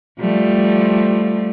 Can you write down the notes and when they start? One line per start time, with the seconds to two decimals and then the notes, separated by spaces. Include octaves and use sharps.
0.19 F3 G3 A3